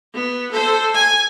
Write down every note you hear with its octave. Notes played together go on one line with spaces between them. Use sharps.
B3
A4 C5
G#5